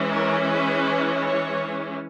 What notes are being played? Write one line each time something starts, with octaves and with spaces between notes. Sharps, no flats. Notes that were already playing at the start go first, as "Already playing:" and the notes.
Already playing: E3 G#3 C#4
A#4
B4
C#5